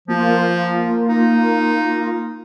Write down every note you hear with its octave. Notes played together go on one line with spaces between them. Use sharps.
F3 A#3 F4
D#4